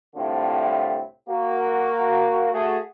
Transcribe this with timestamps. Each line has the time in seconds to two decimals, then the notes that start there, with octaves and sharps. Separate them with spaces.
0.15 C2 A2 D3 C4 E4 F4
1.27 A#3 F#4
2.52 A3 F#4 G#4